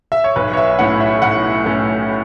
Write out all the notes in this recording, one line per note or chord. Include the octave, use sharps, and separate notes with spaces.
E5
C#5
B1 B4
C#5
E5
A2 A3 C#4 F#5
E5
B1 F#5
A2 A3 C#4